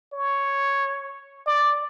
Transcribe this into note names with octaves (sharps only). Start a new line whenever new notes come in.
C#5
D5